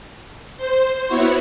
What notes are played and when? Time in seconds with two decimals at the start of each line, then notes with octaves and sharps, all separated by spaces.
0.57 C5
1.07 B3 E4 F#4 C#5